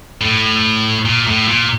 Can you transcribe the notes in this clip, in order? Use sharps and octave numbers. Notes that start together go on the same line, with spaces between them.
A2
A#2
A2
A#2